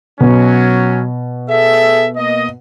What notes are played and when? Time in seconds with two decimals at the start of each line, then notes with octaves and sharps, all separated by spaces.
0.21 B2 F#3 C#4
1.49 G#4 A4 E5
2.17 A#3 D#5